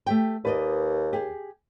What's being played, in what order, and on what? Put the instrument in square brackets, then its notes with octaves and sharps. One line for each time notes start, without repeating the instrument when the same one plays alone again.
[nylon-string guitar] A3 G4 G5
[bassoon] D#2 [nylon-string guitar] B4 D5 D#5
[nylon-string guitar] G4 G#4